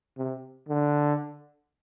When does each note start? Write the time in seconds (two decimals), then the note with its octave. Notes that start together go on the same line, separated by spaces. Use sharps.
0.18 C3
0.69 D3